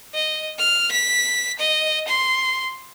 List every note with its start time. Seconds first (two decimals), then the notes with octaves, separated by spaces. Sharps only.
0.14 D#5
0.58 F6
0.92 B6
1.59 D#5
2.08 C6